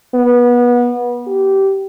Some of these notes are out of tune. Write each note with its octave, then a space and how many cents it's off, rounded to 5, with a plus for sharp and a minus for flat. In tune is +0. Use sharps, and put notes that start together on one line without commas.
B3 -25
G4 -20